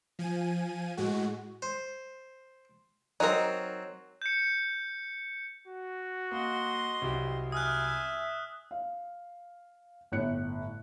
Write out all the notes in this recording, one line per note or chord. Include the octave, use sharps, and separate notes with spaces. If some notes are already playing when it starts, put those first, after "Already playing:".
F3 G#5 D#7
A2 G#3 F#4
C5
F#3 C4 D#4 A#4
G6 C#7
F#4
A#3 D#5 C6
C2 F#3 G4
E5 G#5 D#6 F6 F#6
F5
G1 A2 F#6 C#7